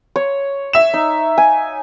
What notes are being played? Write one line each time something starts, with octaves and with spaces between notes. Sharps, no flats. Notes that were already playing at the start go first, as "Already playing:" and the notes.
C#5
E5 E7
D#4
G#5